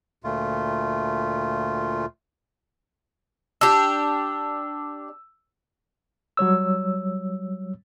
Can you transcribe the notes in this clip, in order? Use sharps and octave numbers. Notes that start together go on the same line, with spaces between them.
D2 A#2 A3 F4
D4 G4 E6
F#3 G3 C#5 E6